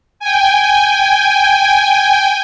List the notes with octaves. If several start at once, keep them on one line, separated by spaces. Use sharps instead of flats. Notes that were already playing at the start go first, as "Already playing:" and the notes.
G5 G#5